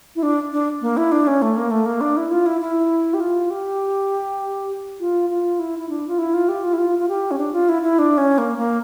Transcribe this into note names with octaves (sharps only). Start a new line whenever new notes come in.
E4
D4
D4
A#3
E4
D4
C#4
A3
A#3
A3
A#3
D4
E4
F4
E4
E4
G4
F4
G4
F4
F4
E4
E4
D4
F4
E4
F4
G4
F4
E4
F4
F4
G4
C#4
D4
F4
E4
E4
D4
C#4
A#3
A#3